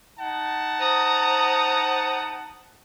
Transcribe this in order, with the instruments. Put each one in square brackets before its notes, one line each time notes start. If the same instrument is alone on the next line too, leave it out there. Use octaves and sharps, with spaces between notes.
[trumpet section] D#4 F#5 A5
[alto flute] C5 [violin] A#5 D#6